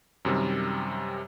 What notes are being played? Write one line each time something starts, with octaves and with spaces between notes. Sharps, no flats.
F#2 C3 D#3 G3